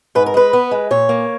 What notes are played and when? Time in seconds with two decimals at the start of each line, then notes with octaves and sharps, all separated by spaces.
0.15 G#2 B4
0.26 A#4
0.34 G#3 B4
0.53 B3
0.71 G#3
0.91 A#2 C#5
1.09 A#3